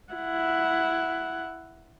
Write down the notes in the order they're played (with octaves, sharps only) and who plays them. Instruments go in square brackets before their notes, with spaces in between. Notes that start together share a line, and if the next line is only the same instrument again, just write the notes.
[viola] E4 F#5